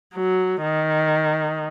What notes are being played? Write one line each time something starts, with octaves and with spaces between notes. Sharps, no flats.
F#3
D#3